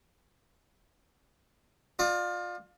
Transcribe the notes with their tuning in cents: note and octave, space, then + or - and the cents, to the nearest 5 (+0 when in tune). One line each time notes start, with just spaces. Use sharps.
F4 +20 D5 +35